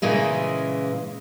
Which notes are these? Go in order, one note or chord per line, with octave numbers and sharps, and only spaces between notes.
A#2 C#3 E3 G#3 A#3